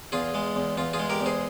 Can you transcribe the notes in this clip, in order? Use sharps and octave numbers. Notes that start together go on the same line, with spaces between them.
E2 F4 G#4
G#3
E2
E2 F4
F4 G#4
G#3
G4 A#4
E2
G#4 C5